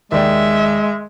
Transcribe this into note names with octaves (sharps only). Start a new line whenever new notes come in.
D#2 G#3 D5 E5 G5